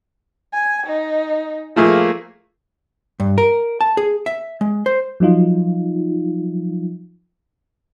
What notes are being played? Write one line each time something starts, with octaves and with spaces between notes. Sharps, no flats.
G#5
D#4
F3 A3 A#3 G#4
G2
A#4
A5
G#4
E5
G#3
C5
F3 F#3 D#4 F4